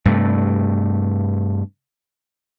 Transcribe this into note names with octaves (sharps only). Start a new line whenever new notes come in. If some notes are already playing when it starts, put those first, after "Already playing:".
G2 C3 A3